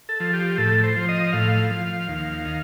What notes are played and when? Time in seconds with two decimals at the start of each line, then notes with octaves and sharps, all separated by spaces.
0.09 A4
0.20 F3
0.33 G4
0.58 A2 A4
0.83 C5
0.96 F3
1.09 D#5
1.33 A2 F5
1.70 F3
2.09 D#2
2.45 D#3